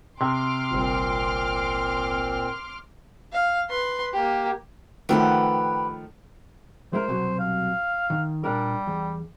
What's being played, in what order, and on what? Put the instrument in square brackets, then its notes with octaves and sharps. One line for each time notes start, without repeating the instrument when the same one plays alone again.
[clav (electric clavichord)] C3 [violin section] C6 D6 F6
[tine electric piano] G1 C2 [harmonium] A#2 C4
[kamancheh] F5
B4 C6
A#3 G4
[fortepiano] D#3 F3 A3 [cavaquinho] G4 B4 F#5
[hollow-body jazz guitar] G#3 E4 A#4 [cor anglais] C5
[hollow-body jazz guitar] C2 B2 F#3
[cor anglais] F5
[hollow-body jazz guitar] D#3
[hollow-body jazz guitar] A#2 D4 A#4 [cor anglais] G3
[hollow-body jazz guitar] E2